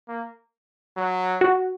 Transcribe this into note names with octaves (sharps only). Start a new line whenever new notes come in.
A#3
F#3
F#4